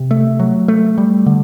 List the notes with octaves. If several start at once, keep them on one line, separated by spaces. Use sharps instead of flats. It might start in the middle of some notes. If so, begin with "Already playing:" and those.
Already playing: C3
A3
F#3
A3
G3
D3